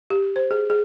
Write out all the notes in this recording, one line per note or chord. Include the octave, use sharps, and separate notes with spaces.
G4
C5
G#4
G#4